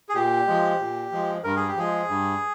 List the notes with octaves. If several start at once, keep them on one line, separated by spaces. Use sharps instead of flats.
G#4
A#2 G4
F3 G#3
A#2
F3 G#3
G2 A#4
G#4
G4
F3 G#3 G#4
G2